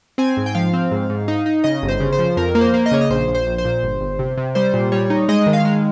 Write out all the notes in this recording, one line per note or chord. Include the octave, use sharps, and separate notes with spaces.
C4 G#5
G#2
G5
F3 F5
C4
G#2
G#2
D#4
D#4
C#3 D#5
G1
C5
C#3
C5
F3
F2 A#4
A#3
C5
A#3
D#5
C#3 C#5
D#5
A#1 C5
A#1
C5
A#1
C5
A#2
G1
G1
C3
C3
G3 C5
A#2
G3 C#5
D#4
G#3 D#5
D#3
F5
G#3